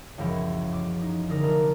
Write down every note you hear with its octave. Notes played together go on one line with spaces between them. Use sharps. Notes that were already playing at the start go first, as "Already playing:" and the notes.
C#2 F#2 E3 F3 G#3
G#6
D6
D#4
E1 D3 A#4 D#6 A#6
F1 F#3 D4 A#5 F6 A6